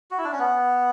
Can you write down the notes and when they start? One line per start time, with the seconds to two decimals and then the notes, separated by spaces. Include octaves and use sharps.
0.11 F#4
0.18 E4
0.24 D4
0.32 C#4
0.39 B3